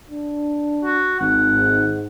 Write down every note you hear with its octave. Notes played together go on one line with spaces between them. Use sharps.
D4
F#4
G#1 F#5
G#2